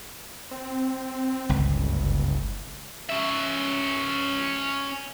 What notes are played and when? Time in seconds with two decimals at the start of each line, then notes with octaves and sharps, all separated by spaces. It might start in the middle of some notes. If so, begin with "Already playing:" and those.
0.51 C4
1.49 G1 C#2
1.76 F#1
3.10 C#4 E5